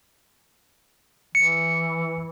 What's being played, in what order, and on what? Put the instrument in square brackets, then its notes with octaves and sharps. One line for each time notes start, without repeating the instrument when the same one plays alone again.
[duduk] E3 [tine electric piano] C#7